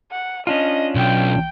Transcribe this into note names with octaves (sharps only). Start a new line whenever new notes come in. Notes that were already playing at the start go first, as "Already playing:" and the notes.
F#5
C#4 D4 F4 D#5
B1 G5